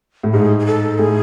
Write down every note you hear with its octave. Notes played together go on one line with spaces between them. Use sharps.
A2
G#2 G#4
G#4
A4
A2 G#4